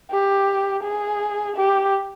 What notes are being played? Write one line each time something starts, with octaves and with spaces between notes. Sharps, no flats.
G4
G#4
G4